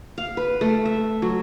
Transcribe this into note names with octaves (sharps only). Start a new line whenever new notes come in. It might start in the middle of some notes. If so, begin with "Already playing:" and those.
F5
B4
A3
E5
F#3